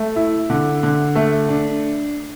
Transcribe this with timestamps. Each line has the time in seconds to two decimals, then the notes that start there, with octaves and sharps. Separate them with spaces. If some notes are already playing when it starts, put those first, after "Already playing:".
Already playing: A3
0.16 E4
0.50 D3
0.83 D3
1.15 A3
1.49 D4